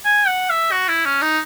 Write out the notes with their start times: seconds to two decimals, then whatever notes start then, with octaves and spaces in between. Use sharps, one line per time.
0.05 G#5
0.27 F#5
0.50 E5
0.71 F#4
0.88 E4
1.05 C#4
1.22 D#4